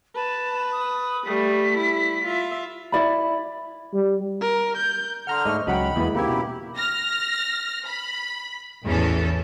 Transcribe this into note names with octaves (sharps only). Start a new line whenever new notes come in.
B4 A5
D#6
G3 A3 B6
E4
F4 E5
E4 D5 B5
G3
A#4
G6
D3 F#5 A#5 C6 F6
G#2 A3 D#5 C#6
C#2 F#3 D#5 F#5 G5 B5
E2 G#3 A#3 B3 E4
G#2 C#3 A#3 C4 E4 G4 G#6
B2 C#4
F6 A#6
B5
A1 E2 E3 C#4 A4